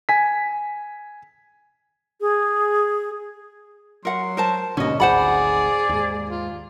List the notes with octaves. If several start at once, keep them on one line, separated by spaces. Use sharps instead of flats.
G#5 B6
G#4
F#3 A#4 F#5 C6
A#4 C5 A5
D#2 G#2 B2 D3 C#4 D#5
G#1 D2 G#4 C5 D5 F#5 B5
D#2 G#2
F4